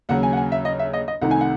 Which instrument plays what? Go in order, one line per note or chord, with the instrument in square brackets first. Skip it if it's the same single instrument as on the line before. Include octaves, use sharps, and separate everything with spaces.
[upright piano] D#2 C#3 F#3 [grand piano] F#5
[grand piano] G#5
F#5
G#5
E5
D#5
E5
D#5
D#5
[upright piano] C2 C3 D#3 A3 D#4 [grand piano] F#5
[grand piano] G#5
F#5